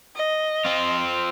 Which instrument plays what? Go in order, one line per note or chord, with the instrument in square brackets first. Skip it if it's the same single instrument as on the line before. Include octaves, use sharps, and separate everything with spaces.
[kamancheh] D#5
[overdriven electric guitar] C4 F4